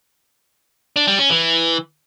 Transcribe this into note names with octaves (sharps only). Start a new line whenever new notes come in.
D4
G3
C#4
E3